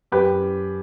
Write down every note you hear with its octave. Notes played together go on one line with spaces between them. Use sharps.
F#2 G4 B4